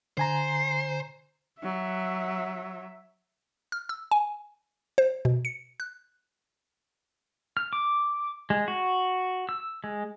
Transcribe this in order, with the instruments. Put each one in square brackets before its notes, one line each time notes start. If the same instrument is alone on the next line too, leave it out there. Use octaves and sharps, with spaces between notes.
[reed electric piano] D3 G#5 A#5 [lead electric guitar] C5
[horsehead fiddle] F#3 E5
[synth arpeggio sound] F6
E6
G#5
C5
B2
C#7
F#6
[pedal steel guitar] F6
D6
G#3
F#4
E6
G#3